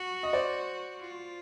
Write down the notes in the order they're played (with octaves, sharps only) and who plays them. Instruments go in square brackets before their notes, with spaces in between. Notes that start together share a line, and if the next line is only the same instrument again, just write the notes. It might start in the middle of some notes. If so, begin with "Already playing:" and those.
Already playing: [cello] F#4
[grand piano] D#5
C5 D5
[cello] F4